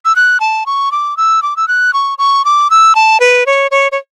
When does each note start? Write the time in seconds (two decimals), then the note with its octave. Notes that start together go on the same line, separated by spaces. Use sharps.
0.05 E6
0.16 F#6
0.40 A5
0.66 C#6
0.92 D6
1.17 E6
1.42 D6
1.56 E6
1.68 F#6
1.93 C#6
2.18 C#6
2.45 D6
2.70 E6
2.95 A5
3.20 B4
3.46 C#5
3.71 C#5
3.92 C#5